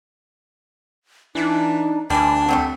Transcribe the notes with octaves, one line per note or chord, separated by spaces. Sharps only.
E3 D4 D#4
D2 E3 G3 D4 G#5
F#3 G3 A3 C4